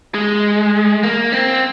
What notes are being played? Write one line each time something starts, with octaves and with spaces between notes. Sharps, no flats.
G#3
A#3
C4